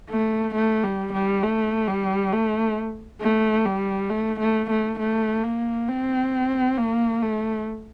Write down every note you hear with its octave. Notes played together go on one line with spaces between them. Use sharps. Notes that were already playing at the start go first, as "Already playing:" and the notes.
A3
A3
G3
G3
A3
G3
A3
A3
G3
A3
A3
A3
A3
A#3
C4
A#3
A3